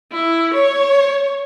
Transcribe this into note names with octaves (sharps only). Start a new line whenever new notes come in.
E4
C#5